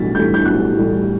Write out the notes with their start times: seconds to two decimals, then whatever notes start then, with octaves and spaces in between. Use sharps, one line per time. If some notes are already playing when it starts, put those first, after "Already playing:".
Already playing: B1 A2 E3 G3 A6 B6
0.15 A2 E3 G3 G6
0.34 G6
0.45 B1 F#6
0.76 A2 E3 G3